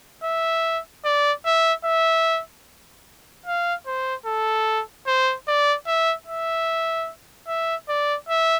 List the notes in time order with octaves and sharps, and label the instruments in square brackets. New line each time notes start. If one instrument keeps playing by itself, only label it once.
[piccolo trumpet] E5
D5
E5
E5
F5
C5
A4
C5
D5
E5
E5
E5
D5
E5